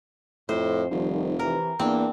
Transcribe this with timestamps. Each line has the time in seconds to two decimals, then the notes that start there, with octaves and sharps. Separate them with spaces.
0.49 F2 A2 C4 C5
0.91 F1 D#3 F3 G3
1.39 C3 E3 A#4
1.79 E2 A#3 C4 D4